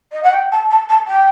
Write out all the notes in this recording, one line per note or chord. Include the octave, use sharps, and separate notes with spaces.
D#5
F#5
G5
A5
A5
A5
G5